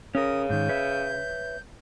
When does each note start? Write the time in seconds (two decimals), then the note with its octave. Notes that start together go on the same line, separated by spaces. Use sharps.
0.15 C#3 C#4 A#4 D#6
0.50 G#2 D#3 G6
0.69 B4 C#5 E5